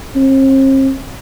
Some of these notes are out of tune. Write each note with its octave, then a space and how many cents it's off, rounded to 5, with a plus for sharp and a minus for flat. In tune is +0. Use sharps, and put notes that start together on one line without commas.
C4 +45